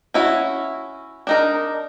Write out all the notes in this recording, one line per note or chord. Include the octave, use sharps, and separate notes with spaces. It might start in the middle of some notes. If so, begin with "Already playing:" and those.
C#4 E4 F#4
D4 D#4 A#4